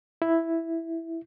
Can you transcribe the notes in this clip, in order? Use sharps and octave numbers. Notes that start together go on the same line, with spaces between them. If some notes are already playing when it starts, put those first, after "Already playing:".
E4